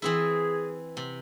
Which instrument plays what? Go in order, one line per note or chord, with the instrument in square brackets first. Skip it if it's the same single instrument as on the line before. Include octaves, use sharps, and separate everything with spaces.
[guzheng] E3 C4 E4 [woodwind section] G#4
[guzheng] C3